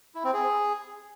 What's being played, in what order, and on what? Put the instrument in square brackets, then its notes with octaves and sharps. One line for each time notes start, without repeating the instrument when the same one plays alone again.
[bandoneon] E4
C4
G#4